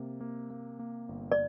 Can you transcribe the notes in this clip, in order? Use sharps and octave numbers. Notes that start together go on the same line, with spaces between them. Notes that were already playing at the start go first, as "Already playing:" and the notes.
Already playing: C3 A#3
A#3
A#3
A#3
G1
D5